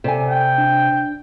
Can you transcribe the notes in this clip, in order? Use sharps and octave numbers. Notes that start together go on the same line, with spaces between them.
C3 A4 D5 G#5
G5
D4